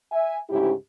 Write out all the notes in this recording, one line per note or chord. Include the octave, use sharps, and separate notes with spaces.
E5 G#5
D2 G#2 C#3 C#4 E4 G4